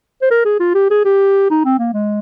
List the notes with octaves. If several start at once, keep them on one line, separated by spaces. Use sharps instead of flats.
C5
A#4
G#4
F4
G4
G#4
G4
D#4
C4
A#3
G#3